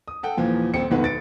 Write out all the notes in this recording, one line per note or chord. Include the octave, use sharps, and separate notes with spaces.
D#6
A4 F#5 G5
D#2 A#2 E3 F3
D#1 C4 C#7
F1 B1 D#3 B4 F#5
A6 D7